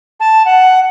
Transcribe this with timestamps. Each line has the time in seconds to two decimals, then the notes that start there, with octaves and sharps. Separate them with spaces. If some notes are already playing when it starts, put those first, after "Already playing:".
0.20 A5
0.45 F#5